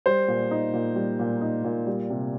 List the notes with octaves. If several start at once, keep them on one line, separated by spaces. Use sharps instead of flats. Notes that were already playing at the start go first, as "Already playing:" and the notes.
G3 C5
A#2
D#4
A#2
G3
A#2
D#4
A#2
G3
C3